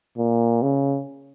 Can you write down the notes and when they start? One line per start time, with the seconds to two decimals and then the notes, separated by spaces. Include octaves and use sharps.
0.18 A#2
0.62 C#3